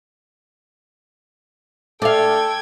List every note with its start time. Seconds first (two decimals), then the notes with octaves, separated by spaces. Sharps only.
2.02 A3 A4 D5 F5 G5 G#6